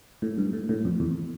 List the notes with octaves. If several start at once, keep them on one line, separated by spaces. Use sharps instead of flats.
A2
G2
A2
A2
F2
E2